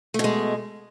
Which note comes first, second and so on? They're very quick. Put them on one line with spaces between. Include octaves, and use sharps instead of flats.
A3 B2 G#3